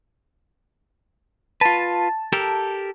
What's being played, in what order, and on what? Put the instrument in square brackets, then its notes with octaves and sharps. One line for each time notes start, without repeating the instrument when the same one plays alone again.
[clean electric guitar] F4 B4 [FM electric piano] A5
[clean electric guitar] G4 A4 A#4